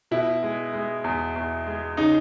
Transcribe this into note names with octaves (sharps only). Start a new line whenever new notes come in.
B2 E4
G#3
G#3
E2
E2
G#3
C#3 D#4